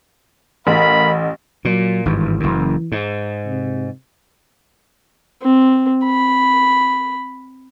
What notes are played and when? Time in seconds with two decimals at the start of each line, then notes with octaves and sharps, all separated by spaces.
0.67 A1 A#4 F5 B5
1.65 A#2 F#3
2.06 G#1 G2 E3
2.40 F#1 F#2
2.92 G#2
3.46 C3
5.42 C4
6.05 B5